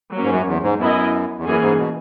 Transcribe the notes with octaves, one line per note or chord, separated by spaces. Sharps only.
F#3 A#3 C#4
G#2
F#2
E2
G#2
F#2 B3 E4 A#4 D#5
E2
F#2 E3 A#3 C#4 G#4
G#2
B2